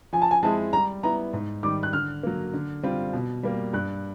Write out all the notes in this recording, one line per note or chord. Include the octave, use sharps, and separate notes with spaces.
F3 G#5
A5
G#5
G#3 C4 E4 G#4 A5
G3 A#5
B3 E4 A#5
G#2
D#3 G3 D6
F#6
D3 F6
F#3 A#3
D3
G3 C4 F4
B2
G3 A#3
G2 F#6